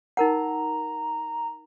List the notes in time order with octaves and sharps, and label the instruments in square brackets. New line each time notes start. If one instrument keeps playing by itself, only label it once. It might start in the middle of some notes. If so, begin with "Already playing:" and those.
[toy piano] D#4 A#4 F#5 [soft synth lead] A#5